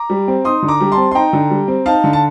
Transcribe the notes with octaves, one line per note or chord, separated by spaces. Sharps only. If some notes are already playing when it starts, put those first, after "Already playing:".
Already playing: A#5 D6
G3
C4
D#4 C6 D#6
D3
A#5 D6
G3
A5 C6
C4
C6
D#4 G5 A#5
D3
G3
C4
D#4 F5 A5
D3
A5